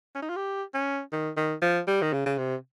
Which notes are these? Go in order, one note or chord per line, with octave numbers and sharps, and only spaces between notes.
C#4
D#4
F4
G4
C#4
D#3
D#3
F3
G3
D#3
C#3
C#3
C3